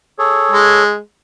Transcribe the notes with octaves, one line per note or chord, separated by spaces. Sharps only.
G#4 A4 C#5
G#3